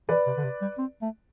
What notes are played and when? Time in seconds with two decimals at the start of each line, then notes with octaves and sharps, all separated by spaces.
0.09 E3 B4 D5
0.27 C3
0.37 D3
0.44 C3
0.62 G3
0.78 C4
1.02 A3